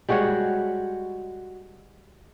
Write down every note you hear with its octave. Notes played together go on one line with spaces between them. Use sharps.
G3 G#3 F#4 C#5